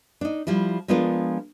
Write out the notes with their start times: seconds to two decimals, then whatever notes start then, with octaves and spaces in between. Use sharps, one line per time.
0.21 D4 D#4
0.47 F3 G3 E4
0.88 F3 G#3 B3 D4 F4 A#4